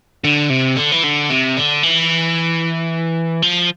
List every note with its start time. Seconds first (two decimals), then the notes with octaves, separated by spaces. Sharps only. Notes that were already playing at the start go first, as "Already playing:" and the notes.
0.24 D3
0.50 C3
0.77 D3
0.92 E3
1.04 D3
1.30 C3
1.57 D3
1.83 E3
3.42 F3